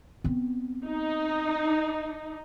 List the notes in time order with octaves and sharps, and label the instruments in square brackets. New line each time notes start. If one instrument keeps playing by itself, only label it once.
[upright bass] B3 C4
[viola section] D#4